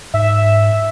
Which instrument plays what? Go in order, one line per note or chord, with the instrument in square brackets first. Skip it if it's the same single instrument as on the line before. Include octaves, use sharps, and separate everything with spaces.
[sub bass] G#2 [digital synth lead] E5